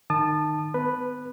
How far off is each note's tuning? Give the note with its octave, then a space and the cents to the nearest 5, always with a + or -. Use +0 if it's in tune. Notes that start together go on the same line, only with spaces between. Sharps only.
D#3 -25 A5 +0 D#6 -40
B3 +25 B4 +0